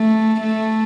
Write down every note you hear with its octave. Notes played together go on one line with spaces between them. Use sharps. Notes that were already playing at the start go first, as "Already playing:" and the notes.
Already playing: A3
A3